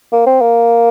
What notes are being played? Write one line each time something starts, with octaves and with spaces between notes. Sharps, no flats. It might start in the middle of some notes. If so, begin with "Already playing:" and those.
A#3
C4
A#3